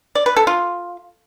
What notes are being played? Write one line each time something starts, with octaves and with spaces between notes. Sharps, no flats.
D5
B4
A4
F4